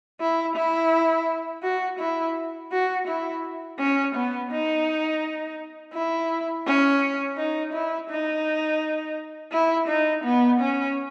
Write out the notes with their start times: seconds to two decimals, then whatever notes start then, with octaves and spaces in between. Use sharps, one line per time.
0.20 E4
0.56 E4
1.63 F#4
1.99 E4
2.72 F#4
3.08 E4
3.79 C#4
4.15 B3
4.51 D#4
5.93 E4
6.66 C#4
7.37 D#4
7.73 E4
8.10 D#4
9.52 E4
9.88 D#4
10.25 B3
10.61 C#4